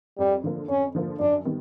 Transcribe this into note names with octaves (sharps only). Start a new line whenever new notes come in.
F2 G3
D3 F3 A#3
F2 C#4
D3 F3 A#3
F#2 D4
D#3 G3 B3